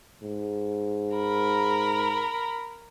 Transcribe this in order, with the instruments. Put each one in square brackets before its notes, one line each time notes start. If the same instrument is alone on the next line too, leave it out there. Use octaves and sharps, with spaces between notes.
[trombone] G#2
[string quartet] A#4 B5